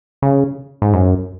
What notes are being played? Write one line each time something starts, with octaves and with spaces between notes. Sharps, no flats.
C#3
G#2
F#2